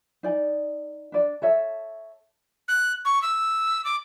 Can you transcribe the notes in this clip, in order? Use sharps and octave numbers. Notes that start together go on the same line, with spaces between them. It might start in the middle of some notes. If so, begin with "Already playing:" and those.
D#4 D5 G#5
D4 D5
A4 C#5 E5
F#6
C#6
E6
D6